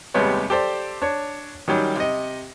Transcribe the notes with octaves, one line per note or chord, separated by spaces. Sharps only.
D#2 C3 G3 G#3 B3 C#5
G4 A4 C5 D5
D4 C#5
D#3 F#3 G3 C#4
C3 D#5